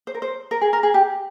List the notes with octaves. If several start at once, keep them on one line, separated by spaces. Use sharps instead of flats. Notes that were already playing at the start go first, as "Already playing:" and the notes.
C5
A#4
C5
A#4
G#4
A#4
G#4
G4